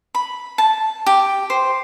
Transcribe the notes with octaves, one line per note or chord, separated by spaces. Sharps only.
B5
A5
G4
C5